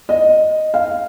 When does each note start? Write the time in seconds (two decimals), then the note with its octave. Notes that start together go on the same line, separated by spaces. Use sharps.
0.09 D#5
0.74 F5